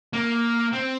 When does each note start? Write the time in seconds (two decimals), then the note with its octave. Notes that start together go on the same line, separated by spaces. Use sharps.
0.13 A#3
0.73 C4